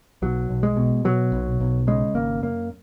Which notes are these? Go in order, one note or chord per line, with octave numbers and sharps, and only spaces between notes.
B1 F#3
B1
G#3
B2
B2 F#3
B1
B1
C#3 G#3
G#1 A#3
F#2 A#3